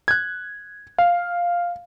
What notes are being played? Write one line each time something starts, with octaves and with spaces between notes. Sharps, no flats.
F#6 G#6
F5